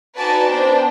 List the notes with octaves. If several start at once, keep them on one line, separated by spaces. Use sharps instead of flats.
D#4 F#4 B4 D5 G#5 A5
B3 D4 C5 G5